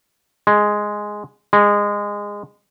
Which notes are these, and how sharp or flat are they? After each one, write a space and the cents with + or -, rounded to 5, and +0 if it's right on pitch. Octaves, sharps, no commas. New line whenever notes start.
G#3 +0
G#3 -20